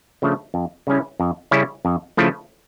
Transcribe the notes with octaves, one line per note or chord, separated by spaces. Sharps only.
C#3 F3 A3 D4
F2
C#3 G3 C#4 E4
F2
C#3 G3 C#4 E4
F2
C#3 F3 A3 E4